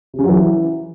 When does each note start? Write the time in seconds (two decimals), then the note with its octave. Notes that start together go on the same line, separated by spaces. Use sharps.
0.14 C3
0.19 C#3
0.24 F#3
0.29 E3